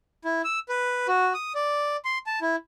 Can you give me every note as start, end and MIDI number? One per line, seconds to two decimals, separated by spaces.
0.25 0.42 64
0.44 0.59 88
0.69 1.07 71
1.08 1.33 66
1.34 1.53 87
1.55 1.97 74
2.05 2.18 84
2.27 2.39 81
2.41 2.56 64